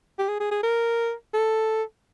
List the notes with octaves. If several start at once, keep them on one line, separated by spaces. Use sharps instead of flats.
G4
G#4
G#4
G#4
A#4
A4